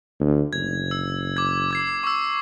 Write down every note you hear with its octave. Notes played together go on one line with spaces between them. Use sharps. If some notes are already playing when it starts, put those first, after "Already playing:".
D2
F#1 G#6
E6
D6 G#6
D6 G#6 C7
C#6 E6